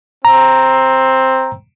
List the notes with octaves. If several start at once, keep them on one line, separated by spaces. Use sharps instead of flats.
C4 A#5